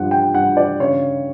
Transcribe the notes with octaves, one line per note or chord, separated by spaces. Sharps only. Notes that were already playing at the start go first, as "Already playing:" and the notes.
Already playing: G2 F3 F#5
G5
G2 F#5
D5
C#3 C#5